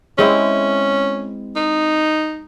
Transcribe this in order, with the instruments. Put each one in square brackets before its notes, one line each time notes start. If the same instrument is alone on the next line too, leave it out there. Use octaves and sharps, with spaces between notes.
[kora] G#3 C4 E4 [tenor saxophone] C#4
[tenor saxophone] D#4